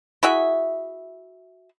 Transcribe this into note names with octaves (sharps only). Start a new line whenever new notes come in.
E4 F#4 G#4 E5